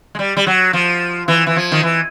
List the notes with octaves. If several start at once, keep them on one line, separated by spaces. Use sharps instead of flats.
G#3
G3
G3
F#3
F3
E3
E3
F3
D#3
E3